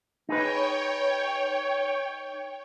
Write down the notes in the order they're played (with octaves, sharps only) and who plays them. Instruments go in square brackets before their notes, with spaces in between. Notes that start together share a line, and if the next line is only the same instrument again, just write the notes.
[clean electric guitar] D#4 G#4 B4 [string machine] C#5 G5